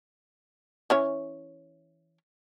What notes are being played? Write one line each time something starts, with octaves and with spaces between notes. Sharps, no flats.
E3 C#4 C#5